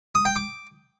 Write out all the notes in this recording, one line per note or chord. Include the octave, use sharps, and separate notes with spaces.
D#6
G5
D6